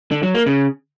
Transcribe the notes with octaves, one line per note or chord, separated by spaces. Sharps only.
D3
F#3
A#3
C#3